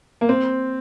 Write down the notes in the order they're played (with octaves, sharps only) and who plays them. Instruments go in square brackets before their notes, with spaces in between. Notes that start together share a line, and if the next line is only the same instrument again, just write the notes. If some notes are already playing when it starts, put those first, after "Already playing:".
[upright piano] A#3
C4